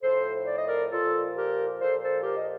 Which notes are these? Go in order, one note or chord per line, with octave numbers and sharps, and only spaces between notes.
A2 F3 A4 C5
D5
D#5
A#4 D5
A#2 F3 F4 A4
G4 A#4
A#2 F3 A4 C5
A4 C5
G4 A#4
D#5